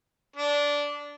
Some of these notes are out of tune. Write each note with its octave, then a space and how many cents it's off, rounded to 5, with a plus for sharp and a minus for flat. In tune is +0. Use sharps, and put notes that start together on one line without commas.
D4 -15